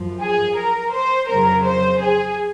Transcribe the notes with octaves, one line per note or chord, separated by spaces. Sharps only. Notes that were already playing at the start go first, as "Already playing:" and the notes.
Already playing: F#2 F3
G#4
A#4
C5
F2 C#3 F#3 A#4
C5
G#4